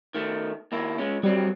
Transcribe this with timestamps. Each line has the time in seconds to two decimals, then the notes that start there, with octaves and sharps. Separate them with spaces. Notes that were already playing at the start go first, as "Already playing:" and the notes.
0.15 D#3 A3
0.72 D#2 A#3 E4
0.98 C#3 G#3 C#4
1.23 F#3 G3 C4